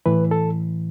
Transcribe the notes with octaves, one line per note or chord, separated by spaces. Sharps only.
A2 E3 B4
A4